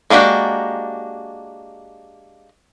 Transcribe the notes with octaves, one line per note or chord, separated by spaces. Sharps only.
G#3 A#3 D4 F#4 G4